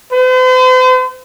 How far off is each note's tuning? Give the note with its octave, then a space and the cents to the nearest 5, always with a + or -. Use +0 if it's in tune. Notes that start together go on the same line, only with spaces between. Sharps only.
C5 -45